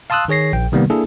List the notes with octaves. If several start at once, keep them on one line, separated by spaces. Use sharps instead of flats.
F5 A5 C6 D#6 E6 F#6
D#3 G#4 C#5 A#6 C7
A#1 G5
C3 D#3 G3 A#3 B3
A#3 D4 E4 G#4 A4